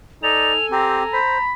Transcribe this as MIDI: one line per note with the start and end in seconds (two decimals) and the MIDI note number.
0.23 0.56 63
0.23 1.18 69
0.23 0.53 74
0.23 1.18 80
0.23 0.66 101
0.72 1.02 60
0.72 1.04 67
0.72 1.44 82
1.13 1.38 72
1.13 1.54 83